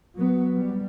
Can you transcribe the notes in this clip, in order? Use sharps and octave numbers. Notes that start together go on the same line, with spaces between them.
F#3 B3
G3